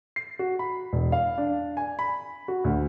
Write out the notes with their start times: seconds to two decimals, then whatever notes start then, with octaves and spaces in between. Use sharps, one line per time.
0.16 C7
0.39 F#4
0.59 B5
0.93 E1
1.12 F5
1.38 D4
1.77 G#5
1.99 B5
2.48 F#4
2.64 D2